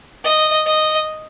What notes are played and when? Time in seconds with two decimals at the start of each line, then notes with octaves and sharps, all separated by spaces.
0.24 D#5
0.67 D#5